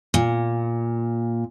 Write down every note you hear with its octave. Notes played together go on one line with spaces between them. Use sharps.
A#2